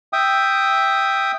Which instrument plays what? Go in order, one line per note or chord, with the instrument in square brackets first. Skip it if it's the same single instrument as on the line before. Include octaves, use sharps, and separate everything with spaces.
[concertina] E5 G5 D#6